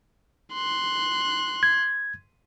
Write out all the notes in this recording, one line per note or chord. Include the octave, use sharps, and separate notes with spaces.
C6 F#6
G#6